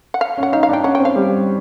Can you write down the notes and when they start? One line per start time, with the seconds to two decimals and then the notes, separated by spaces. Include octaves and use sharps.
0.14 F#5
0.21 F5
0.37 C#4
0.43 F#5
0.52 D#4 F5
0.63 F5
0.69 D4 G5
0.84 C#4 F#5
0.95 G5
1.00 C4
1.05 F5
1.16 G3